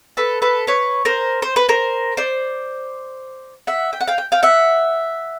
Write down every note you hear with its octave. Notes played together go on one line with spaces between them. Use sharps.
A4 B4
A4 B4
B4 C#5
A#4 C5
C5
B4
A#4 C5
C5 D5
E5 F#5
G5
F#5
F5 G5
G5
F5 G5
E5 F#5